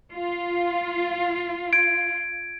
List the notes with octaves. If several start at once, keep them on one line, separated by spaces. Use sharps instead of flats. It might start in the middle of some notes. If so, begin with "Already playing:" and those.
F4
G#6 D7